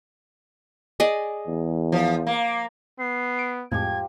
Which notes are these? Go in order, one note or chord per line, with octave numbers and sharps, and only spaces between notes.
G#4 D5 D#5
E2
F3
A#3
B3 C7
D7
F2 A2 F3 G#3 G4 G#6